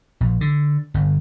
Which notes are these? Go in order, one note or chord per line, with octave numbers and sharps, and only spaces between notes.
A#1
D3
G1